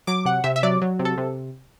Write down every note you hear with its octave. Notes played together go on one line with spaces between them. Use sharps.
F#3 D6
C3 F#5
C3 E5
E5
F#3 D5
F#3
C3
A4
C3